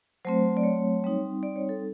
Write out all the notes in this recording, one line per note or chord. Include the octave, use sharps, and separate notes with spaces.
F#3 A3 C4 C5
D5
C#5
G3 C4 D#4
D5
C#5
A4